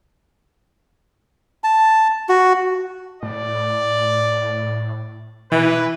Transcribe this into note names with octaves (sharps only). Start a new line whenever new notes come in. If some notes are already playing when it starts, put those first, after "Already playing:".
A5
F#4
A2 D5
B2 E3 B4